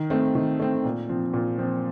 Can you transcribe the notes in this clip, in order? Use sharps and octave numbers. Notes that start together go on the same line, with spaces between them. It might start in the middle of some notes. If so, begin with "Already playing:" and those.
Already playing: D#3
A3 C4
D#3
A3 C4
A#2
F3 C4
A#2
F3 C4